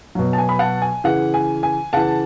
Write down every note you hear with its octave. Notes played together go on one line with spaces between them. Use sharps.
B2 F#3
A5
G#5
B5
F#5 A5
G#5
C#3 E3 F#5
G#5
G#5
C#3 E3 F#5 A5